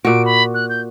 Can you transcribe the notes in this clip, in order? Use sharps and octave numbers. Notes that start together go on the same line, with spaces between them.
A#2 F#4 D7
B5
F#6
G6